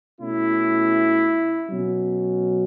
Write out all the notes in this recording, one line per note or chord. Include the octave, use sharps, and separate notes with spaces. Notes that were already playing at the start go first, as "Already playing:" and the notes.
B2 A3 C#4 E4
B2 F#3 C#4